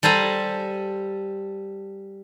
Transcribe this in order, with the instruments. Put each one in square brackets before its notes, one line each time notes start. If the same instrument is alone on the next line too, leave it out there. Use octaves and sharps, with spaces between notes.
[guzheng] G3 A4 C5 G#5 A#5